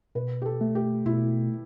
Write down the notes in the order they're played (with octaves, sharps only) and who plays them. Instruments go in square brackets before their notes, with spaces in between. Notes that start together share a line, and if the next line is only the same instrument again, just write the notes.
[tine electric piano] B2 [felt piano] B4
[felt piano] G4
A4
[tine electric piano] A3
[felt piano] G4
[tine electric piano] B2 [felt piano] E4